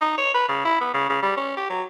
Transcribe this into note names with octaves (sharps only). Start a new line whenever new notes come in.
D#4
C#5
B4
C#3
E4
B3
C#3
C#3
G3
C#4
G4
F#3